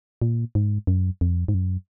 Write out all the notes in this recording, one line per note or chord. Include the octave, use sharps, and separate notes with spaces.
A#2
G#2
F#2
F2
G#2
F#2